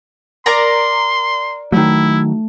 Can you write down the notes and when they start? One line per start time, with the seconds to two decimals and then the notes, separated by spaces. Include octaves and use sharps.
0.46 A#4 D5 A#5 C6
1.72 D#3 F#3 A3 E4